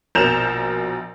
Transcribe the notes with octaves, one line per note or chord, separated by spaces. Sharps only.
A#1 B2 A#4 G6 E7 F7